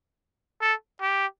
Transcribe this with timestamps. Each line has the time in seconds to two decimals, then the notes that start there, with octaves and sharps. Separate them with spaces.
0.61 A4
1.02 G4